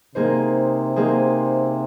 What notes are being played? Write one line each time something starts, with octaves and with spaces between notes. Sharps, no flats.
C3 A#3 D#4 G#4 C5
A#3 D#4 G#4 C5